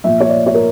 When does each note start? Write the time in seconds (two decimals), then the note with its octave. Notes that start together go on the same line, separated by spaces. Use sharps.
0.04 A#2 F3 E5
0.21 C#5
0.29 D5
0.47 C#5
0.54 A#4